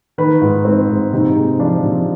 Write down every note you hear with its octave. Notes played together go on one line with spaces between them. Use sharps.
D#3 B4
G#2
G#2 C4
G#2
C3 D#4
G#3
F3 D4
C3